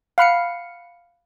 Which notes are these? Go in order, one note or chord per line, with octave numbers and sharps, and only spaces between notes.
F5 F#5 B5 F6 C7 C#7